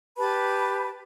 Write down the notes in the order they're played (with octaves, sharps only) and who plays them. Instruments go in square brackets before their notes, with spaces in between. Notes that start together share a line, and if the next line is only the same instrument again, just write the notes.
[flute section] G4 B4 A5 B5